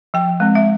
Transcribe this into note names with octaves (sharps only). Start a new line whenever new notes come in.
F3 G5
G#3 C4
E5